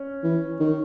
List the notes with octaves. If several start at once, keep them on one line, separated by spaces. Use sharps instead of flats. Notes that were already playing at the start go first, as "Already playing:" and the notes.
Already playing: C#4
E3
D#3